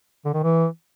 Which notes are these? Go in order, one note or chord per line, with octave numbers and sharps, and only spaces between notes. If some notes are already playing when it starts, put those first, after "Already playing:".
D3
D#3
E3